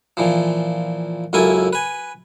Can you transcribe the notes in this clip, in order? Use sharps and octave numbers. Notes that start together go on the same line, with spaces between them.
A#2 E3 F3
C#2 F#2 A#3 E4 A4 G#5
B4 G#5